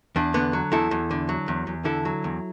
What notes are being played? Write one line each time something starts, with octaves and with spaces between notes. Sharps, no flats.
E2 D4
D3 B3
F#3
E2 E4 A4
E2
D3
F#3
E2
E2
D3 E4 A4
F#3
E2